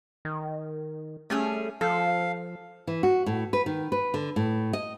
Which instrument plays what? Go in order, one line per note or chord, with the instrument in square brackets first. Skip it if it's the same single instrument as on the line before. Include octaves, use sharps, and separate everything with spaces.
[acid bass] D#3
[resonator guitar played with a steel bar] G3 C#4 G#4 [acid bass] A3
[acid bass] F3 [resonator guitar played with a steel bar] A4 [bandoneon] F5
[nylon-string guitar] E3
F#4
A2
B4
D#3
B4
D3
A2
D#5